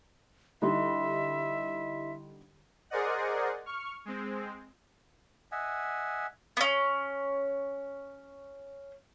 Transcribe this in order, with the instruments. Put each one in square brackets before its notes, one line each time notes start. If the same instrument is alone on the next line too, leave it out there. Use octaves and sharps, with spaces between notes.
[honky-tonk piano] D3 G3 D#4 [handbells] E4 D#5 C6 [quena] E5
[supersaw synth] G#4 A#4 C5 D5 D#5 F#5
C#6 F6
G#3 C4
[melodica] D#5 E5 F#5 G#5
[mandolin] B3 C#4